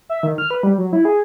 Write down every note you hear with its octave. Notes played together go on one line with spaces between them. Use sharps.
E5
D#3
F6
B4
G3
F#3
E4
G#4